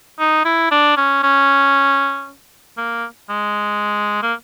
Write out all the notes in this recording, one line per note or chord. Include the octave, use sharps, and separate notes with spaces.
D#4
E4
D4
C#4
C#4
A#3
G#3
A#3